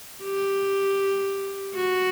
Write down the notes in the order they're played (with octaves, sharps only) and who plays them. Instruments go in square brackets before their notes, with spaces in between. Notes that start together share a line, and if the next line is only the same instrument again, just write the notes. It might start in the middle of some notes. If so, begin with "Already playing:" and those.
[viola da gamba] G4
F#4